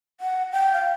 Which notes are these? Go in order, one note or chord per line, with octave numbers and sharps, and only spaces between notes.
F#5
G5
F5